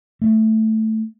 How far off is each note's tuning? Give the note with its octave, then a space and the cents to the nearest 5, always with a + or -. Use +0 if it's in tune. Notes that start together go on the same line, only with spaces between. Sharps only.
A3 +0